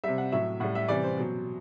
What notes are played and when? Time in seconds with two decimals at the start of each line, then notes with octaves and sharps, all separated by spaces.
0.04 C3 G3 E5
0.18 F#5
0.32 A2 F#3 E5
0.60 A2 G3 F#5
0.75 E5
0.88 C3 E3 G3 D5
1.04 C5
1.17 B2 F#3